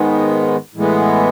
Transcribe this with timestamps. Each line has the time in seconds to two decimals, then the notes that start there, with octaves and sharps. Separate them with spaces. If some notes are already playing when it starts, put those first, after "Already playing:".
Already playing: G#2 D#3 G#3 B3
0.74 A2 E3 G#3 B3